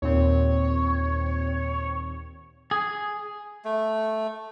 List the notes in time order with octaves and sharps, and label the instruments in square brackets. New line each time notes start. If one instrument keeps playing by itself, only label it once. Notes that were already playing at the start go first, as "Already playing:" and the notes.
[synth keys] D#2 A#2 C4 [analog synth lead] C#5
[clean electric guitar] G#4
[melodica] A3